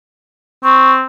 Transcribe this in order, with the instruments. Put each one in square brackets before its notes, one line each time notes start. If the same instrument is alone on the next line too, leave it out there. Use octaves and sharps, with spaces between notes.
[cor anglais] C4 [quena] C#6